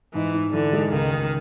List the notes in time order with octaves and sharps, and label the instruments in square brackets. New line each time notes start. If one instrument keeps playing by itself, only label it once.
[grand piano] G#2 [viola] E3
[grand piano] G#2
[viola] D3 [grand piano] E3
[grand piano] G#3
[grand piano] C#2 [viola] D#3
[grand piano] C#2